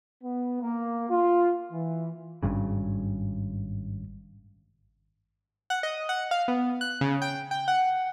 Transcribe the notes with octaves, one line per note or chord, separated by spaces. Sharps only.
B3
A#3
F4
E3
G#1 G2 C#3
F#5
D#5
F#5
F5
B3
F#6
C#3
G5
G5
F#5